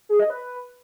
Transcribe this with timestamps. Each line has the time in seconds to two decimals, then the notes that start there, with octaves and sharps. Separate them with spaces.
0.09 G#4
0.20 D#5
0.30 B4